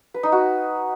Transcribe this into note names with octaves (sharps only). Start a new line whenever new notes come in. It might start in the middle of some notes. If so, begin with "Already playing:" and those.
B4
D#4
F#4